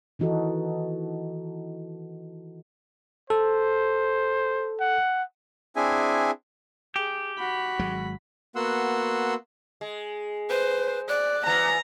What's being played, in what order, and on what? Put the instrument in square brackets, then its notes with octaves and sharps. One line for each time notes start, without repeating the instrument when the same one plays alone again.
[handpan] D#3 E3 D#4 F#4 A4
[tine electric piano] A4 [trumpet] C5
[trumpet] F#5
[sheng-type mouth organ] C4 D4 E4 G#4 E5 G#5
[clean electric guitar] G4 [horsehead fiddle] G#4
[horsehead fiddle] F#4 [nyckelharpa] B5
[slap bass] G#1 F#3 G#3
[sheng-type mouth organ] A#3 B3 F#4 F#5 C6 E6
[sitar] G#3
[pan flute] B4 [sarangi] C5
[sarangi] D5 [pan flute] F#6
[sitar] E3 B3 [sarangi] A#5